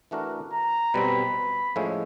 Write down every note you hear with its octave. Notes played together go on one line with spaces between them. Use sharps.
E3 A3 D4 F#4 A#4
A#5
B2 G3 C4 B5
A2 F3 G#3 C#4 E4